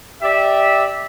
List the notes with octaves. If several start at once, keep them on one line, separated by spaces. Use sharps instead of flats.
G4 D5 E5